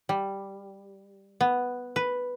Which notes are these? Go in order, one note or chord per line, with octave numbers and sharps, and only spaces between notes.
G3
B3
B4